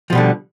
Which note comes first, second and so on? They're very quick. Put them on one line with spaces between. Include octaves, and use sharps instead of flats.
F3 B2 G3 D3